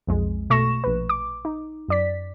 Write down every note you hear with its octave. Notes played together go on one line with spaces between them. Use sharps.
B1 F2 G#3
B2 A3 C#6 A#6 E7
A#1 B4
D6
D#4
F#2 D5 B6